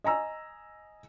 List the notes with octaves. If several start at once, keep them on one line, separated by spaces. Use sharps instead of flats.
D#5 G#5 A#5 E6